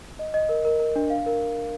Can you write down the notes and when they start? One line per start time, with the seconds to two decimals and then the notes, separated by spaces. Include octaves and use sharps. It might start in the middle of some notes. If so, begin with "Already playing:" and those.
0.19 D#5
0.34 D#5
0.49 A#4
0.65 A#4
0.80 A#4
0.96 D4
1.10 F5
1.26 A#4